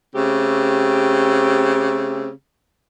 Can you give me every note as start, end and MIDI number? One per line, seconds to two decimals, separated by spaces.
0.15 2.29 49
0.15 2.29 57
0.15 2.29 60
0.15 2.29 67